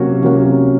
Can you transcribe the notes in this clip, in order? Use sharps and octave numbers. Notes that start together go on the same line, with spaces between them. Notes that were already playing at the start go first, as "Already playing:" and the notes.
Already playing: C3 F#3 A#3 C#4 F#4
C3 F#3 A#3 C#4 F#4